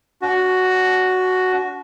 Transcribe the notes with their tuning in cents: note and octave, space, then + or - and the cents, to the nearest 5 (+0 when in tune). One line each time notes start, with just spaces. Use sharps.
D4 -40 F#4 +0